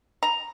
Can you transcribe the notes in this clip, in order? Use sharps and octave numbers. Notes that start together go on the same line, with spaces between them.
A#5